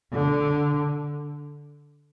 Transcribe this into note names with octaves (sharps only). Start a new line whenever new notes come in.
D3